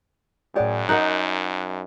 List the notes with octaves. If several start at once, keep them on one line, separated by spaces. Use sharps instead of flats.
F#2 A2 G#4 C#5 D5 F#5 G5
D#4 A#4 D#5 F#5 F#6